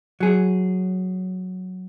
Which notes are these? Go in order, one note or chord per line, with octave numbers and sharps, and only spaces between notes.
F#3 G#4